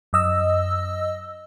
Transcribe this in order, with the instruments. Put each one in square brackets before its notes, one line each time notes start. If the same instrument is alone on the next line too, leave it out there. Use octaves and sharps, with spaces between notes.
[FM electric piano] F#2 D#5 E6